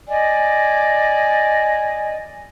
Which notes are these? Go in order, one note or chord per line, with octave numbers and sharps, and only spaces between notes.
D5 D#5 G#5